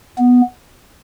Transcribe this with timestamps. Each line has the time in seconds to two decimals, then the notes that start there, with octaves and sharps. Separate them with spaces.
0.18 B3